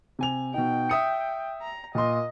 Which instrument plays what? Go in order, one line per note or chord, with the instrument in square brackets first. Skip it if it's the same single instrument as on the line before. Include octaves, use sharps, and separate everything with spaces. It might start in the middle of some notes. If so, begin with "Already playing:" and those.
[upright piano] C3 G#5 F7
[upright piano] B2 D#4 [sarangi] G5
[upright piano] E5 D#6 C#7
[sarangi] A#5
[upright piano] A#2 C6 [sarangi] D#5